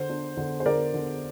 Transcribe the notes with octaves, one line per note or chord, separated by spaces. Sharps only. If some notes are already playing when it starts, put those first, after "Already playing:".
Already playing: D3 C5
D4
D3
C5
D3 A#4 D5
D3